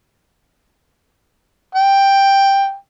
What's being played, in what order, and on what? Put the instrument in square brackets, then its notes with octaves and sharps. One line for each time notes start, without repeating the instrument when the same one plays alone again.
[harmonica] G5